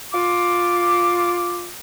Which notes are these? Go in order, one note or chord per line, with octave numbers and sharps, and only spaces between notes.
F4 D6